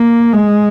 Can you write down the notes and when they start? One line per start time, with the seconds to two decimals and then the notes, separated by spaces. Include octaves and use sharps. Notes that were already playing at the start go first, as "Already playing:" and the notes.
Already playing: A#3
0.33 G#3